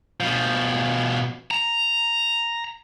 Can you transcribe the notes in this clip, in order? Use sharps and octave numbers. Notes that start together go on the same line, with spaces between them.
B2 F3
A#5